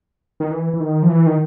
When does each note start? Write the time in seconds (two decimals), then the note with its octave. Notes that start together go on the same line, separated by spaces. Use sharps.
0.40 D#3
0.51 E3
0.73 E3
0.80 D#3
1.03 F3
1.09 E3
1.26 D#3